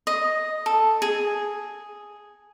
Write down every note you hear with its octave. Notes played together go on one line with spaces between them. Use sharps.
D#5
A4
G#4